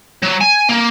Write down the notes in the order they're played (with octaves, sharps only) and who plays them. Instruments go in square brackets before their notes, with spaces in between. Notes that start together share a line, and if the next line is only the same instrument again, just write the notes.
[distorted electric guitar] F#3
G#5
A#3